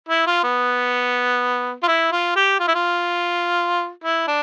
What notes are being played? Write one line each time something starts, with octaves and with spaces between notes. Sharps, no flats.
E4
F4
B3
F4
E4
F4
G4
F4
E4
F4
E4
D4